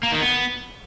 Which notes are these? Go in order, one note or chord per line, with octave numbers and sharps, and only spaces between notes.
A#3
D#3
B3